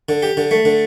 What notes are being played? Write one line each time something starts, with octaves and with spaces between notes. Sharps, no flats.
D3
G4
D3
A3
D3